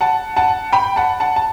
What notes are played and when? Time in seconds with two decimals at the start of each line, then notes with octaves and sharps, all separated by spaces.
0.01 F#5 A5
0.36 F#5 A5
0.72 G5 B5
0.96 F#5 A5
1.20 F#5 A5
1.36 A5